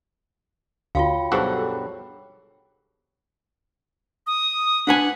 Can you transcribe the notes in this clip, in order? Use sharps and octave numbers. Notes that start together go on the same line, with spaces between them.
D2 F4 F#4 C#5 F5 G5 B5
B1 G2 F#4 G#4 A4 C5
D#6
D4 B4 F#5 G#5